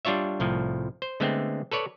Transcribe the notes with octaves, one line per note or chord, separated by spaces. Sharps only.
G3 D4 F4 C#5 E5
C2 A2 F3
C5
D3 G#3 A3 B3 C4
A4 B4 C#5 D5